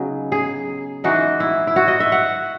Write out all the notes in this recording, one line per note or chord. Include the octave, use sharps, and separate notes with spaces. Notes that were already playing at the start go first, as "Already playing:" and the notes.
Already playing: C#3 F#3 B3 D#4
G#4
E3 G#3 D#4 F#4
E4
E4
F#4
D#5
E5
F#5